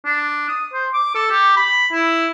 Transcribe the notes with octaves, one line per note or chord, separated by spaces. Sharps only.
D4
D#6
C5
D6
A4
G4
B5
E4